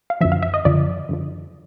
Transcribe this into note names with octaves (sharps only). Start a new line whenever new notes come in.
F5
F#2 D3 F3 E5
F5
E5
D#5
F#2 D3 F3 D5
F#2 D3 F3